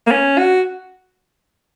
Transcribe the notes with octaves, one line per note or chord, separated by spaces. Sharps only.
A#3
C#4
F#4